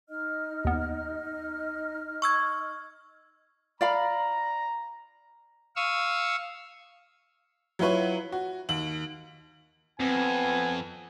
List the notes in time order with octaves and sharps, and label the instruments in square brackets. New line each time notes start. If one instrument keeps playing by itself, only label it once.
[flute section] D#4 D#5 F6
[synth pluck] D#2 B3
[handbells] C#6 E6 G#6
[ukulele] D5 F5 B5 [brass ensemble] A#5
[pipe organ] F5 C#6 D#6 E6
[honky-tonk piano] F#3 E4 F4 B4 C#5
F#4
D#2 F#7
[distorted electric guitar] F2 [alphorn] B3 [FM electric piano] C4 [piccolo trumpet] G#5